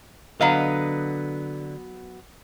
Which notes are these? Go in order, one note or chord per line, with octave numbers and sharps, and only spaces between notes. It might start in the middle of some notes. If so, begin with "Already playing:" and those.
D3 F#3 B3 D#5 F5